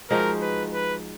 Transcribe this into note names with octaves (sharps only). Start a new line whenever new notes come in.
F3 G#3 D#4 F#4 A#4
B4
B4